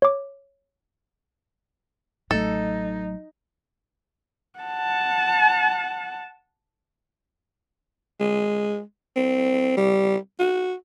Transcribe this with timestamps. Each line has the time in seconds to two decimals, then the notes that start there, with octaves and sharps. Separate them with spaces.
0.02 C#5 D6
2.31 A1 F#3 A3 D#4 A4
4.59 F#5 A5
8.20 G#3
9.16 C4
9.77 G3
10.39 F#4